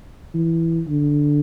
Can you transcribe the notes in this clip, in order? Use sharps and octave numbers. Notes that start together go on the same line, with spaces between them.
E3
D3